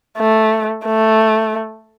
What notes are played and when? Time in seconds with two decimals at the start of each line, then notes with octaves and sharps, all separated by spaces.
0.18 A3
0.85 A3